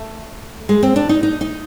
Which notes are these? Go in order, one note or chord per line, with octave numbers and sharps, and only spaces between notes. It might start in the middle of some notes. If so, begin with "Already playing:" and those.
Already playing: A3
G#3
C4
D4
D#4
D#4
D#4